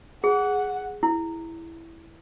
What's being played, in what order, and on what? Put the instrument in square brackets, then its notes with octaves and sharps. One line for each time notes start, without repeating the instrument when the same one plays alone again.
[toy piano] G#4 [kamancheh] F#5
[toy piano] E4